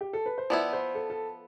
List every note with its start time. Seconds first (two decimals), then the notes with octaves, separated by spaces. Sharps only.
0.01 G4
0.13 A4
0.26 B4
0.38 C5
0.50 F3 B3 E4 D5
0.73 C5
0.95 A4
1.10 A4